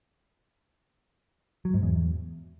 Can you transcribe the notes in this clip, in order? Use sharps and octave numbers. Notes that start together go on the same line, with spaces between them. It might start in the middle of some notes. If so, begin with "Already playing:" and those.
F#3
G#2
E2